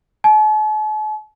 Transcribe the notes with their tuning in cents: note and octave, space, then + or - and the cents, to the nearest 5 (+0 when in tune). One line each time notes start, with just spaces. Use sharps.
A5 -45